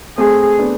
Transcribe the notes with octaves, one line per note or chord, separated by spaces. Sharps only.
A3 C4 G#4
B3 D4